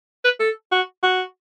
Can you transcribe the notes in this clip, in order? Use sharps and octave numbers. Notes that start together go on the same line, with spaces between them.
B4
A4
F#4
F#4